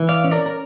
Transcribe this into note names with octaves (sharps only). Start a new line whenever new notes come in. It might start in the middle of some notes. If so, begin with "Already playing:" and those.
Already playing: E3
D5 F5
C#4
A#4 D5
A#4